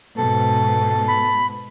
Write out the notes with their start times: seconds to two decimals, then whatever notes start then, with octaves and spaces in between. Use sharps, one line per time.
0.18 G#2 B2 A4
1.08 B5